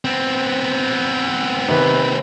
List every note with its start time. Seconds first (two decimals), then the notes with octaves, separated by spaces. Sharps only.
0.05 B3 C4
1.68 C3 D#3 B4